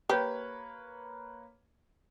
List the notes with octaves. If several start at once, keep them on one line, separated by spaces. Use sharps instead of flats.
A#3 G4 B4 C#5